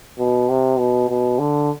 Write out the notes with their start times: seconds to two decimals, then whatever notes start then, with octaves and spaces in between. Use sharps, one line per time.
0.18 B2
0.49 C3
0.79 B2
1.09 B2
1.39 D3